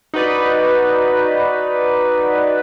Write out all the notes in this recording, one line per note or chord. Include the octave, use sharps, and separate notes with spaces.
D#4 F#4 B4 D5